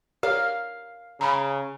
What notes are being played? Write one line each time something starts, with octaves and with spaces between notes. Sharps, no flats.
G4 A#4 C#5 D5 F5
C#3 A#5 B5